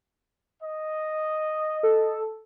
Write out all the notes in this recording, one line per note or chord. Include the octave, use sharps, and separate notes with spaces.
D#5
A4